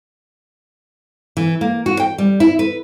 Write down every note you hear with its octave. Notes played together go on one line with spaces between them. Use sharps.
E3
A#3
F#4
G5
G3
E4
B4